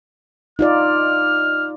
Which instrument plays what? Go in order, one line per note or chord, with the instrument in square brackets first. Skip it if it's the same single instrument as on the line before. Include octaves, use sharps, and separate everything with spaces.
[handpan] D#4 F4 D5 [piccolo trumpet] F6